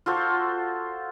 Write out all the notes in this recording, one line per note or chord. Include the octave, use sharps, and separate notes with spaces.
F4 F#4 A4 C5